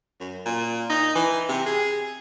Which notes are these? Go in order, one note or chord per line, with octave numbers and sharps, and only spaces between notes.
F#2
A#2
D#4
E3
C3
G#4